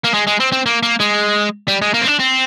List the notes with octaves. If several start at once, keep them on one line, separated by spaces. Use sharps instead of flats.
A#3
G#3
G#3
C4
C4
A#3
A#3
G#3
G3
G#3
A#3
C4
D4
C4